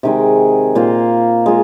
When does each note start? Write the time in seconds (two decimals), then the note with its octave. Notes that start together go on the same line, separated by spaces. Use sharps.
0.03 C3 D#3 G#3
0.75 A#2 A#3 F4 C5
1.46 G#3 F4